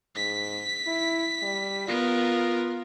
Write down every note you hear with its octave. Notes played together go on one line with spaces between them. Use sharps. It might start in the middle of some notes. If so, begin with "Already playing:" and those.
G#2 B6
E4
G3
B3 F4 A#4